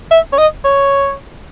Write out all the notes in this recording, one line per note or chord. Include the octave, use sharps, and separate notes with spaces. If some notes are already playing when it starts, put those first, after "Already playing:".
E5
C#5
D#5
C#5